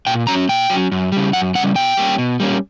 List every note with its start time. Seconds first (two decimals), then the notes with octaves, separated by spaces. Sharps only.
0.07 A#2 G5
0.27 F#3 C#4 A#5
0.49 A#2 G5
0.70 F#3 C#4
0.92 F#2
1.12 C#3 G3
1.33 F#2 F#5
1.55 C#3 G3 F#5
1.75 B2 G5
1.97 G3 A#3 C#4
2.18 B2
2.40 G3 A#3 C#4